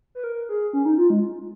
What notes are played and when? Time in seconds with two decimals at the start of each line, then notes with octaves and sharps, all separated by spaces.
0.15 B4
0.24 A#4
0.49 G#4
0.73 C#4
0.85 D#4
0.98 F4
1.10 G#3